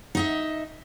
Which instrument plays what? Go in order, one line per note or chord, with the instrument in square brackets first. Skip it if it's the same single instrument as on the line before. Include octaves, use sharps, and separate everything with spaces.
[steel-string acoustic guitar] D#4 D#5 E5